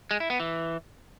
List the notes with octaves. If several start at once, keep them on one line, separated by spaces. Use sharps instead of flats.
G#3
E4
B3
E3